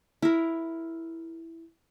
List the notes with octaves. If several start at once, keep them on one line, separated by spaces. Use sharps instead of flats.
E4 A#4